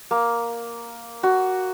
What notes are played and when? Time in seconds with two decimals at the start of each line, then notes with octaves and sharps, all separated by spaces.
0.11 A#3
1.23 F#4